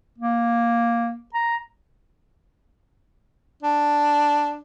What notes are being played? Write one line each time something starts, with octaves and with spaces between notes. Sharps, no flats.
A#3
A#5
D4